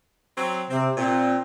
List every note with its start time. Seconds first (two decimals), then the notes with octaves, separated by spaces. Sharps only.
0.38 F#3 C4
0.70 C3 C4
0.97 A#2 C4